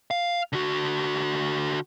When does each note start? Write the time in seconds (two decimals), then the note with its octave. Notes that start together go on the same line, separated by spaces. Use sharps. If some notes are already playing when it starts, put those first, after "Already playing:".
0.11 F5
0.53 D3 F#4